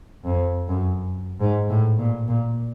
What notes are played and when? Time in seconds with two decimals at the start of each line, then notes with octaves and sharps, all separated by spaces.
0.25 F2
0.69 F#2
1.41 G#2
1.70 A2
1.99 A#2
2.28 A#2